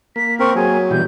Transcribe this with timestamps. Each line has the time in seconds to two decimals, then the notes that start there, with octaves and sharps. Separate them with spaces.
0.16 A#3 B6
0.40 C4 A#4 C#6
0.55 F#3 G#4
0.91 B2 E3 G3 G6